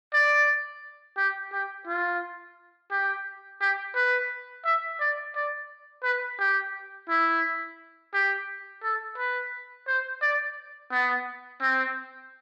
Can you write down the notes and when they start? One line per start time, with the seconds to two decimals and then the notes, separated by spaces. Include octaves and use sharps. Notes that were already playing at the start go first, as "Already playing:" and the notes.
0.13 D5
1.17 G4
1.53 G4
1.87 F4
2.91 G4
3.61 G4
3.96 B4
4.65 E5
5.00 D5
5.35 D5
6.04 B4
6.39 G4
7.09 E4
8.14 G4
8.83 A4
9.18 B4
9.88 C5
10.22 D5
10.92 B3
11.61 C4